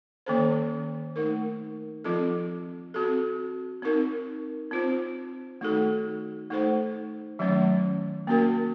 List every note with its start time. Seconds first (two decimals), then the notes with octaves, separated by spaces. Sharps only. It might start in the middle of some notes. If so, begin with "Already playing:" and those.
0.26 D#3 A#3 C#4 A4 C5
1.16 A3 D#4 A#4
2.04 F3 C4 F4 A4
2.94 C4 F#4 A4
3.82 C4 D#4 A#4
4.71 C4 F4 C5
5.61 D#3 A3 D#4 F#4 A4
6.50 A3 D#4 A4 C5
7.39 D#3 F#3 A3 C#4
8.27 A#3 C#4 F#4 A#4